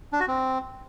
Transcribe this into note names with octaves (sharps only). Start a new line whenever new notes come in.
D4
F#4
C4